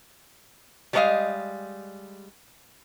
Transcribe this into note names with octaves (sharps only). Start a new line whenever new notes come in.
G3 G#3 A#4 C#5 D#5 F5